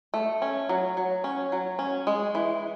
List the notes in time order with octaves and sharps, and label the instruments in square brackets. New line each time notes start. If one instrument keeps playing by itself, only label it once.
[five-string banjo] A3
C#4
F#3
F#3
C#4
F#3
C#4
G#3
E3